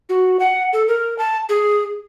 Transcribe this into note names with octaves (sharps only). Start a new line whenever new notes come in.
F#4
F#5
A4
A#4
A5
G#4